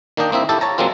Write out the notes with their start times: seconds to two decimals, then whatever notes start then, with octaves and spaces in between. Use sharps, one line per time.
0.17 D#3 A#3 D4 D#5 G5
0.32 A#3 C4 E4 E5
0.49 E4 G4 A4 A5
0.61 C#5 A5 A#5
0.78 F#3 G#3 A#3 C4 F4